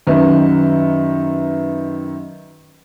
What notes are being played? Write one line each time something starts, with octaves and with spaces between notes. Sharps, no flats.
F#2 D#3 B4 E5